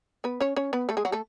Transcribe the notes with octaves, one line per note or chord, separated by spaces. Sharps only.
B3 B4
C#4 C#5
C#4 C#5
B3 B4
A3 A4
G#3 G#4
F#3 F#4
A3 A4